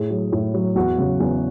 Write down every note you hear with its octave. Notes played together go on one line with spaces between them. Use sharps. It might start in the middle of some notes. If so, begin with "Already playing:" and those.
Already playing: A2 G#4
F#3
A2
F#3
E2 F#4
C#3 F#3
E2